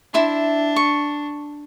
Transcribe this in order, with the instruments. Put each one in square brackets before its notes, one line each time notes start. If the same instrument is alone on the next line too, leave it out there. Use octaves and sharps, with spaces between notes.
[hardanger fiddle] D4 [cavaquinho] E4 E5 C6
[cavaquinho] C#6